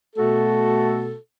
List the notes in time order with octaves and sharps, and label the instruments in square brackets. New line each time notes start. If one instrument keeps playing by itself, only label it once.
[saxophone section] B2 A3 F#4 A4